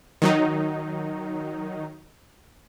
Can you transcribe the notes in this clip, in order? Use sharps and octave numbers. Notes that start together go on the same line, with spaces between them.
D#3 F#3 D#4